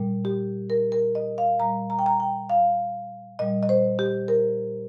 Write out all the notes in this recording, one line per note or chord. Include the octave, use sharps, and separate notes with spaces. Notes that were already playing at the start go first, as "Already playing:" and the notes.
Already playing: A#2 G3
G4
A#4
A#4
D#5
F5
A#2 G3 A#5
A#5
G5
A#5
G5
F5
A#2 G3 D#5
D#5
C5
G4
A#4